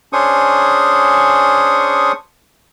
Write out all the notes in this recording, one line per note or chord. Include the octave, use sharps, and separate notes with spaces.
C#4 D4 G#4 C5 C#6 D#6